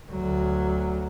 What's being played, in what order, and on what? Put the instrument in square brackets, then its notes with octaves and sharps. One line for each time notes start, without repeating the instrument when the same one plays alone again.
[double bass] D2 F#3